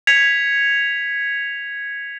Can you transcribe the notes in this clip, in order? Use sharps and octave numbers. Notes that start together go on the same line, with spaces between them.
G#6 B6 C#7 F7